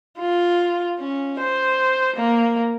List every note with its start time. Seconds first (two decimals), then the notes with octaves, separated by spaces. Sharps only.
0.19 F4
0.99 C#4
1.40 C5
2.16 A#3